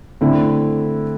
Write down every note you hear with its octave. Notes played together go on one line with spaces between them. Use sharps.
D3 A3 C4 E4